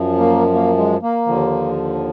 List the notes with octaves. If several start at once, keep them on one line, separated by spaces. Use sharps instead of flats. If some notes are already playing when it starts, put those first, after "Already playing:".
Already playing: F#2 F3
A#3
A#3
G#3
A#3
D#2 D3 F3